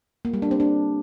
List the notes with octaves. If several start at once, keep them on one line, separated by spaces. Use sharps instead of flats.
A#3
G3
D4
C4
D4